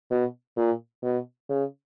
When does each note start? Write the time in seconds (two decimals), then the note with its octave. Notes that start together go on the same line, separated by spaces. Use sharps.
0.11 B2
0.57 A#2
1.03 B2
1.49 C#3